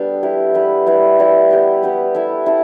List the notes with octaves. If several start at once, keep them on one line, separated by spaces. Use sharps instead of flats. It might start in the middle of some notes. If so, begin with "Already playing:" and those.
Already playing: G3 B3 D4 A4
E4 G4 B4
E4 G4 B4
G3 E4 B4
G3 E4 B4
B3 G4 B4
B3 G4 B4
E4 A4 E5
E4 A4